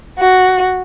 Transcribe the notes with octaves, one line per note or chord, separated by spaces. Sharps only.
F#4